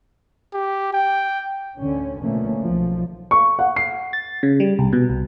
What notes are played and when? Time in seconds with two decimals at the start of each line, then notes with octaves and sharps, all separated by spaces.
0.54 G4
0.94 G5
1.79 D2 D3 C#4
2.23 B2 D3 F3 A3 A#3 C#4
2.64 B1 F3
3.31 C#6
3.59 F#5
3.76 C7
4.13 A6
4.43 C#3
4.60 G3
4.79 C2
4.93 B2
5.10 C2